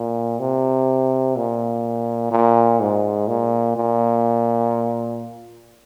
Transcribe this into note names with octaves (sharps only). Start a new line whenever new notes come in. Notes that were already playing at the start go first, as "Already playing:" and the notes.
Already playing: A#2
C3
A#2
A#2
G#2
A#2
A#2